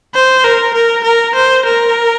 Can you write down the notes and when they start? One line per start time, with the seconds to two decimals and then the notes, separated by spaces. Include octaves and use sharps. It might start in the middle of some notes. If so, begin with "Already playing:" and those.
0.15 C5
0.44 A#4
0.74 A#4
1.04 A#4
1.35 C5
1.65 A#4